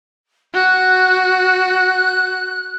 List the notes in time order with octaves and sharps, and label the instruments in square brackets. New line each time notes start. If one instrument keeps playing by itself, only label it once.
[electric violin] F#4 [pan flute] F#6